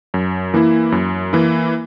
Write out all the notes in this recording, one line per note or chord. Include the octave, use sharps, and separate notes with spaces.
F#2
E3 A#3 E4
F#2
E3 A#3 E4